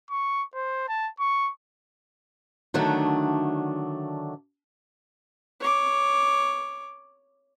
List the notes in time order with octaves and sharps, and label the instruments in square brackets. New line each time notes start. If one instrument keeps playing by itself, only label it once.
[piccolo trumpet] C#6
C5
A5
C#6
[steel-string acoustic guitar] D3 D#3 F#3 A3 D4
[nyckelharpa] C#5 D6